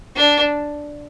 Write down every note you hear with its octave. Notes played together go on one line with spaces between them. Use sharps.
D4